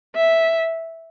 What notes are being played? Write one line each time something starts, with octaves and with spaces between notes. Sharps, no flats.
E5